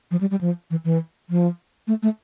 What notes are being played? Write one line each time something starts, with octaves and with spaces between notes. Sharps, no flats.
F3
G3
G3
F3
E3
E3
F3
A3
A3